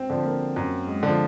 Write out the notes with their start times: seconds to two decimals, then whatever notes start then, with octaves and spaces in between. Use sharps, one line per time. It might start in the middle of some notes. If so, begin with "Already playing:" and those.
Already playing: C4
0.10 D3 F3
0.25 A#3
0.56 F#2
0.87 G#3
1.03 D3 F3